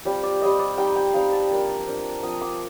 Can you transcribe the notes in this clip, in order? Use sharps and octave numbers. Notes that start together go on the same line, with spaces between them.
G3 C4 F4 G4
D5
G3 C4 F4 D#5
D5
G3 C4 D#4 G5
G5
G3 C4 D#4 F5
A5
F3 A#3 D4
F3 A#3 D4
F3 C4 F4 D#6
D6